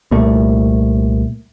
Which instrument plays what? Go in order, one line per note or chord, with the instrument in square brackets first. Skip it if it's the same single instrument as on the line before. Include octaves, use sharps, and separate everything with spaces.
[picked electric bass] C2 A#2 A3